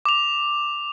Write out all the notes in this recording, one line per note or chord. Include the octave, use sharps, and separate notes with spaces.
D6 F7